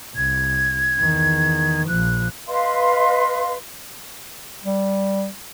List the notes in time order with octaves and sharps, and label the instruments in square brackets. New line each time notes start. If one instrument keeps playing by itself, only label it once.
[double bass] C2 [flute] G#6
[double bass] E2 D#3
[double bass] A#1 F3 [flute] F#6
[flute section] B4 D#5 F5 C6
[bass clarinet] G3